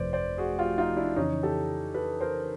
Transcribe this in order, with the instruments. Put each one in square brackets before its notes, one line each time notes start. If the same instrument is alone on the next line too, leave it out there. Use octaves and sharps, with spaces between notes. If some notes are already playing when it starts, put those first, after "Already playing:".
Already playing: [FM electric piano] G1 F2 C3 F3 A3 [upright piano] B4 C5 D5
[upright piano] C5 D5
F#4 G#4
F4 G4
D#4 F4
D4 E4
[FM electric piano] F2 C#3 E3 [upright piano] C#4 D#4
[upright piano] G4 A4
A4 B4
A#4 C5